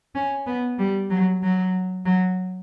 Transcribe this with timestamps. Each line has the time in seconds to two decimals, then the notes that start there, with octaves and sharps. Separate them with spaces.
0.15 C#4
0.46 B3
0.79 G3
1.10 F#3
1.43 F#3
2.05 F#3